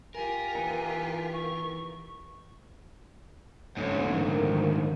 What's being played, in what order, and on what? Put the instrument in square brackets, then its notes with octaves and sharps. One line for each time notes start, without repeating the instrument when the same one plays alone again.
[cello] F4 G4 [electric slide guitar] A#4 [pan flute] G#5
[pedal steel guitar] E3 B3 D#4
[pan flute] C#6
[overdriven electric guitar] D2 G#2 [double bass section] C#4
[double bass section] D#3 F3